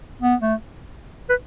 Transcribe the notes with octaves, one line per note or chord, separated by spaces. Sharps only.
B3
A3
B4